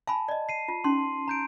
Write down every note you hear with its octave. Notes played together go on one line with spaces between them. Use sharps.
F5 G#5 A5 B5
D5 D#5
C7 D#7
F4
C#4 D#4 C6
A#5 G6 D7